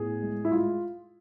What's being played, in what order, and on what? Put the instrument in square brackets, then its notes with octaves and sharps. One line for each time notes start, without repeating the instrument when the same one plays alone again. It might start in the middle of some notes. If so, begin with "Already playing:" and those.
Already playing: [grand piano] A2 B3 G#4
G#3
E4
G#3 F4